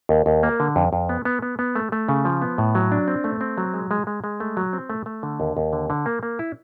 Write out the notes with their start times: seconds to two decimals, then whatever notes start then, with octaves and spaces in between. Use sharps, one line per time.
0.09 D#2
0.26 D#2
0.43 A#3
0.60 D3
0.76 F2
0.93 F2
1.09 B3
1.25 B3
1.42 B3
1.59 B3
1.76 A3
1.92 A3
2.09 C#3
2.25 F3
2.42 B3
2.58 A2
2.75 F#3
2.92 D4
3.08 C4
3.24 A3
3.41 C4
3.58 F#3
3.74 G#3
3.91 G#3
4.07 G#3
4.24 G#3
4.40 A3
4.57 F#3
4.73 C4
4.90 A3
5.06 A3
5.23 D3
5.40 D#2
5.57 D#2
5.73 D3
5.90 D3
6.06 A#3
6.23 A#3
6.39 E4